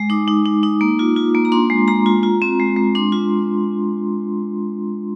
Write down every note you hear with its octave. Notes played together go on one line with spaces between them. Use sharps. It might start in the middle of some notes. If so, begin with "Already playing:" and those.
Already playing: G#3
D#4 D6
D#4
D#4
D#4
A#3
F4
F4
A#3
A#5
D4 C6
G#3
G#3 A#5
F4
F4
C4
G#3
G#3
D4 C6
F4